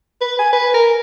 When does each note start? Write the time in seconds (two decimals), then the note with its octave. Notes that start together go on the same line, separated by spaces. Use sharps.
0.21 B4
0.39 G#5
0.53 B4
0.74 A#4